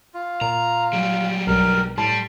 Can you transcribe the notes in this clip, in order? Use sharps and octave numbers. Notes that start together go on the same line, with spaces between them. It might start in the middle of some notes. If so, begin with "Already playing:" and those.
F4
A#2 A#5
F#3 G3
B1 G2 A#4
A2 G3 A5 C6